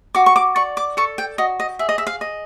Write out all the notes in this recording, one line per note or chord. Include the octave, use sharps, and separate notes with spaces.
F#4 D6
C#6
D6
D5 C#6
D6
A4 C#6
G5
F#4 D#5
D#5
G#4 E5
D#5
E5
F5
D#5